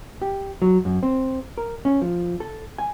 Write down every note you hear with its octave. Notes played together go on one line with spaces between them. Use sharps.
G4
F#3
F#2
C4
A#4
C#4
F3
A4
G#5